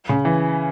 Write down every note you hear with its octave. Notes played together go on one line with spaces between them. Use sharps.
C#3
E3